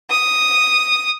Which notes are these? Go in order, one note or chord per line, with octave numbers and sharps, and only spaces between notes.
D#6